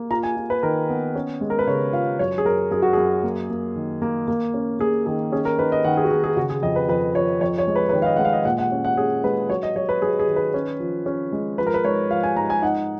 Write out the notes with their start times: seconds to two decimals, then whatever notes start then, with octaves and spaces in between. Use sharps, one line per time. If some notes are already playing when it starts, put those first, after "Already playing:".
Already playing: A#3
0.11 F4 A#5
0.23 G#5
0.37 F4
0.50 B4
0.63 D#3 A#4
0.89 B3
1.15 C#4
1.41 G#3
1.50 A#4
1.59 B4
1.67 C#3 C#5
1.93 F4 F5
2.19 F#2 C#5
2.38 G#4
2.46 F#2 A#4
2.71 F#2 G#4
2.82 F#4
2.93 F#2 G#4
3.24 A#3
3.50 A#3
3.76 D#3
4.02 A#3
4.28 A#3
4.54 C#4
4.80 A#3 G#4
5.06 D#3 G#4
5.32 C#4 G#4
5.45 A#4
5.58 D#3 B4
5.72 D#5
5.84 D#3 F#5
5.97 G#4
6.04 F#4
6.11 D#3 G#4
6.24 G#4
6.37 C#3 F#4
6.49 G#4
6.63 F2 D#5
6.76 B4
6.89 F2 B4
7.15 F3 C#5
7.41 F2 C#5
7.58 C#5
7.67 G#3
7.76 B4
7.89 B4
7.93 D#3 C#5
8.02 F5
8.06 D#5
8.16 G#3 F#5
8.25 F5
8.33 D#5
8.45 A#2 F#5
8.58 F#5
8.72 C#4
8.84 F#5
8.97 C#4 G#4
9.24 G#3 B4
9.50 F#3 C#5
9.63 D#5
9.76 F#3 C#5
9.89 B4
10.02 F#3 G#4
10.19 G#4
10.28 D#3
10.36 B4
10.54 C#4
10.80 F3
11.06 C#4
11.32 G#3
11.58 F3 B4
11.67 A#4
11.74 B4
11.85 G#2 C#5
12.10 F3 F5
12.23 G#5
12.36 G#2 A#5
12.50 G#5
12.62 D#4 F#5